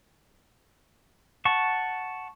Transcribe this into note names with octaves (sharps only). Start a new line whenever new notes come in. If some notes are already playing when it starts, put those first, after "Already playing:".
F#5 A5 C#6